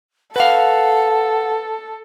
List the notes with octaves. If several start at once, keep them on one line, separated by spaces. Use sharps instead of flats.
A4 B4 F5 F#5